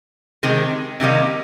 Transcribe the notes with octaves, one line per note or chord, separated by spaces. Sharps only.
C3 D#3 G#3 C4
C3 D#3 G3 A#3 D#4